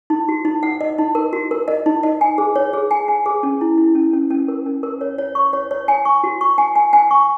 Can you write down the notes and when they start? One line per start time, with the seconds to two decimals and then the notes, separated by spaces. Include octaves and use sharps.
0.10 D#4
0.28 F#4
0.45 D#4
0.63 F#5
0.81 D#5
0.98 D#4
1.15 A#4
1.33 F#4
1.51 A#4
1.68 D#5
1.86 D#4
2.03 D#5
2.21 G#5
2.38 G#4
2.56 C#5
2.73 G#4
2.91 G#5
3.08 G#5
3.26 G#4
3.43 C#4
3.61 E4
3.78 E4
3.95 C#4
4.13 C#4
4.30 C#4
4.48 A#4
4.66 C#4
4.83 A#4
5.01 C#5
5.18 C#5
5.35 C#6
5.53 C#5
5.71 C#5
5.88 G#5
6.05 C#6
6.24 F#4
6.41 C#6
6.58 G#5
6.75 G#5
6.93 G#5
7.11 C#6